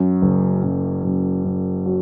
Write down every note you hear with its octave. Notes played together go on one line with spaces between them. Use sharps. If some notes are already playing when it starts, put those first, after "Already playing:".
Already playing: F#2
F#1
F#2
F#2
F#2
F#3